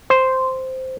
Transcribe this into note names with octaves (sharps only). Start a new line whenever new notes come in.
C5